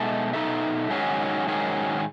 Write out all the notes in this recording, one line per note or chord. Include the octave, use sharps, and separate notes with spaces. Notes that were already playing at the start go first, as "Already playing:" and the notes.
Already playing: B2 G#3 D#4 A4 E5
B2 G#3 D#4 A4 E5
G#2 D#3 F#3 C#4 G#4
G#2 D#3 F#3 C#4 G#4